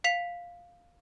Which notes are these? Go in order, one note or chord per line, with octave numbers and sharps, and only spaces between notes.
F5 B6 F7